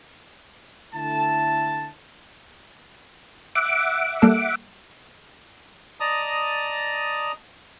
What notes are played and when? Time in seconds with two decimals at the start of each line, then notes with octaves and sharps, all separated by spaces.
0.94 D3 A3 E4 A5
3.55 E5 F#5 D6
4.22 G3 A#3 A4
6.00 D5 D#5 A5 A#5 D#6